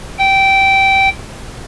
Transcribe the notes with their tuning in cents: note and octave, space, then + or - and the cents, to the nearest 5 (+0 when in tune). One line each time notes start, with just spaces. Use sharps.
G5 -15